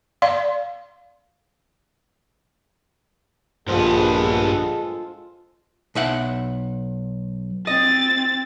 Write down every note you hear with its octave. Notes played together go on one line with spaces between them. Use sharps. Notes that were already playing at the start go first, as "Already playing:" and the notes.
D5 F5 C6
A#1 G2 G#3 B3 F4 A4 C5
B1 E5 F#5
C4 D#5 A6